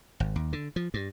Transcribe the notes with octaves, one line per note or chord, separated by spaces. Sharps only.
G#1
D#2
D3
F3
G2